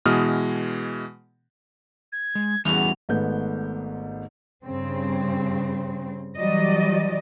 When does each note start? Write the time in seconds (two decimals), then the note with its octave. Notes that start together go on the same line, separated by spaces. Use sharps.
0.06 B2 E3 G#3 D#6 F6
2.12 G#6
2.35 G#3
2.65 E2 G3 C#4 E4 F#4 F7
3.09 G#1 G#2 A3 B3 G6
4.64 G2 C#3 C4
6.37 E3 F#3 G3 D5 D#5